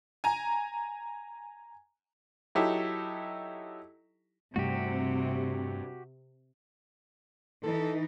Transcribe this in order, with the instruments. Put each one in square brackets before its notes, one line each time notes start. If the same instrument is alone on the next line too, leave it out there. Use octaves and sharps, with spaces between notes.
[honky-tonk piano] G#5 A#5
[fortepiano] F#3 D#4 E4 G4 A4
[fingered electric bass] G2 G3 A3 [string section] C3 [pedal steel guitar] F#4 G4
[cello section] E3 D#4 [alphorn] A4